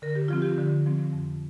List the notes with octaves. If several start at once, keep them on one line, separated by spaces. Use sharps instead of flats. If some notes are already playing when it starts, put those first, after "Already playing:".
D3 A#4
G4
F3 C4 F4
G4
D3
F3 C4
F2